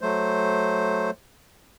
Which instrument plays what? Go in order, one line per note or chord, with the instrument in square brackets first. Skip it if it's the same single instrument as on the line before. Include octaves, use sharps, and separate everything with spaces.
[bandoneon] F#3 A3 C5